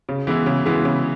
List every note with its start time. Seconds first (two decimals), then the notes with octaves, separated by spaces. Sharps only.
0.09 C#3
0.27 E3 G#3 B3 E4
0.46 C#3
0.65 E3 G#3 B3 E4
0.85 C#3